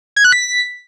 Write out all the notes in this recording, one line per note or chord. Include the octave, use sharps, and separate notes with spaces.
G#6
F#6
B6